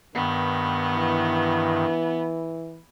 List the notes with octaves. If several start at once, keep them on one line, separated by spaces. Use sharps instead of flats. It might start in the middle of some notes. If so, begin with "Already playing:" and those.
G2 D#3 B3
E3